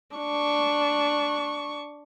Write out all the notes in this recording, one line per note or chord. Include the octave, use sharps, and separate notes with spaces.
D4 C#6